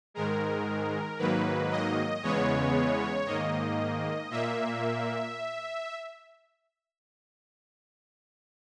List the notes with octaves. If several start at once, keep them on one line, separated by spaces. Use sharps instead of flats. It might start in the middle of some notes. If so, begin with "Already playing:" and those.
G#2 D#3 G#3 A#4
G#2 D#3 F#3 A#3 B4
D#5
E2 C#3 G#3 B3 C#5
G#2 D#3 A#3 D#5
A#2 A#3 E5